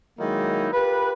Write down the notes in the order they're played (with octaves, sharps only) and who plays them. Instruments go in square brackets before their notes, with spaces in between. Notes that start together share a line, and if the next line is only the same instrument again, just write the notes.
[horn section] D#3 F#3 G#3 A#3 D#4 E4
F4 G4 A#4 B4